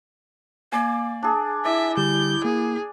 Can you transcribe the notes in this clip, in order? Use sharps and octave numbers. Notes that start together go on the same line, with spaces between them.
A#3 D5 G#5
D4 G#4
E4 D5 E5
D3 G3 G4 G6
A#3 G#4